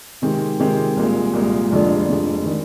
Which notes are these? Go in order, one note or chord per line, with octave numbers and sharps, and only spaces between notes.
C3 D#3 G#3 C4 G4
C3 D#3 G#3 C4 G4
C2 A#2 G#3
C2 A#2 G#3
F1 F2 D3 G#3 D4
F1 F2 D3 G#3 D4
D#3 G#3